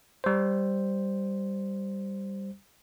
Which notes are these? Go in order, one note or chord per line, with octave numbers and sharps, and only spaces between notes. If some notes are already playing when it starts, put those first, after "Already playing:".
G3 C5